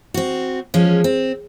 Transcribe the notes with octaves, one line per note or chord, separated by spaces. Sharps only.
C4 F#4
F3 G#3 C#4
C4